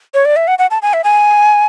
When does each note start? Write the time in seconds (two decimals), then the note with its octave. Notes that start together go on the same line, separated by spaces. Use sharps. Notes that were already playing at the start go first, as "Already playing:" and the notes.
0.14 C#5
0.25 D5
0.36 E5
0.48 F#5
0.59 F#5
0.71 A5
0.82 G#5
0.93 E5
1.04 G#5